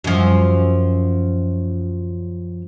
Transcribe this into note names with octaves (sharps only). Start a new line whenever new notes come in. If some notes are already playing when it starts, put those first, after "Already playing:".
F#2 F3